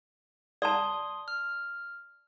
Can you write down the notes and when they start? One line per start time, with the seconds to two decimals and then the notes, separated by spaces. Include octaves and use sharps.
0.62 D5 A5 C6 D#6
1.28 F6